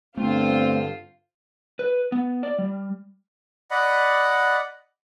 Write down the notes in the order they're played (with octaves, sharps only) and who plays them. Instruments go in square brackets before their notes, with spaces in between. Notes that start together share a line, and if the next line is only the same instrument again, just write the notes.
[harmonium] G2 D3 [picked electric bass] A3 B3 [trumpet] C4 [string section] F4 C5
[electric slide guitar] B4
B3
D5
G3
[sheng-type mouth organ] D5 D#5 F#5 B5